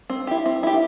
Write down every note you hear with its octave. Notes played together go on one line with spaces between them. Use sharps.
C4
E4 G4
C4
E4 G4